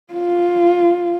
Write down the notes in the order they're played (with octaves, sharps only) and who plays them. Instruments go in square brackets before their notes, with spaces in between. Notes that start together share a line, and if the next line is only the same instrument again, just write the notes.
[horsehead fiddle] F4